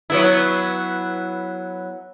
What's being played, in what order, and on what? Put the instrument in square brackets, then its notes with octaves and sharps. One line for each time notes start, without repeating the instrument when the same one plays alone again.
[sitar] F#3 B3 E4